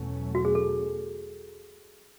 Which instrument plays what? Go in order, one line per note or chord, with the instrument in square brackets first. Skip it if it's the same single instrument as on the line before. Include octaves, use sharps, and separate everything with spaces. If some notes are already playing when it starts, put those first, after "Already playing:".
Already playing: [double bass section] E2 B2 F#3 A3 C#4
[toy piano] F#4
G#4
A4